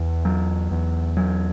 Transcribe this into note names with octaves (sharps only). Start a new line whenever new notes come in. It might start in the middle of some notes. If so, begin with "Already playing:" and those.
Already playing: E2
F#3
E2
F#3